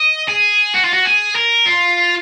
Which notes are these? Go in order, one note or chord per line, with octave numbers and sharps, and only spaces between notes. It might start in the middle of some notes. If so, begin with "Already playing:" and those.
Already playing: D#5
G#4
F#4
F4
F#4
G#4
A#4
F4